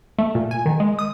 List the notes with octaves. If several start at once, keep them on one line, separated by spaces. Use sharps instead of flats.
A3
A#2
G#5
D#3
G#3
D#6